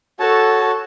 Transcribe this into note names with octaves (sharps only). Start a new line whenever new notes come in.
F#4 A4 C#5 A5